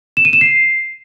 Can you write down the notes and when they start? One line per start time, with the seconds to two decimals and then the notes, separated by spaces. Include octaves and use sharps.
0.17 E7
0.25 D#7
0.33 E7
0.41 C7